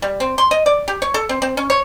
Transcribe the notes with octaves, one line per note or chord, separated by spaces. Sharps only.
G3
C4
C6
D#5
D5
G4
C#5
A4
C4
C4
C#4
C#5